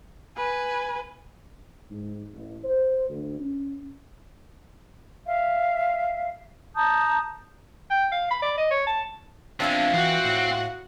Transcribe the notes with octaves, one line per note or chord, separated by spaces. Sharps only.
B4 G#5
G#2
A1
C5
D2
C#4
E5 F5
A5 A#5 D#6 G6
G5
F5
B5
D5
D#5
C#5
A5
E2 G#3 C4 D4 F4 E5 F5
E3 C4 F#4 F#5
A2